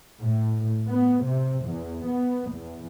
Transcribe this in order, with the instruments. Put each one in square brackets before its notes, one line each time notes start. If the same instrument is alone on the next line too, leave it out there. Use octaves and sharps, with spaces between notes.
[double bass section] A2
B3
C3
E2
B3
E2